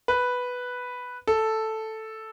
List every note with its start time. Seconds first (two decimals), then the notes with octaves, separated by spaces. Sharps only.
0.08 B4
1.27 A4